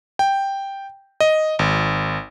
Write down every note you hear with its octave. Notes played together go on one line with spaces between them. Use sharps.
G5
D#5
G#1